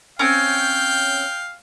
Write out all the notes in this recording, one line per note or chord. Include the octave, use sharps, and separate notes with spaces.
C4 C#4 F5 G5